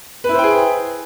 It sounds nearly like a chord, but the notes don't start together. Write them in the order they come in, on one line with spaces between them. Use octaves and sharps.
B4 E4 C5 G5 G#4